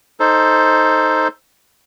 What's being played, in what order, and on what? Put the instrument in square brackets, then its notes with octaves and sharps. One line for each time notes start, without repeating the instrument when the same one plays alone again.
[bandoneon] D#4 A4 C5